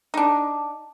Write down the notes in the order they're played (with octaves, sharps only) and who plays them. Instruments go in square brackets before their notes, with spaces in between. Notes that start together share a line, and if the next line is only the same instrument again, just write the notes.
[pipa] D4 D#4